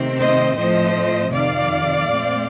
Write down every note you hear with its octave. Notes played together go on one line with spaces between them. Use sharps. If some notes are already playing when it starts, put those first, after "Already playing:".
Already playing: C3 D#3 A3 C4
C5 D#5
A2 F3 A3 C4 C5 D#5
F2 C3 D#3 D5 F5
A#2 A3 C4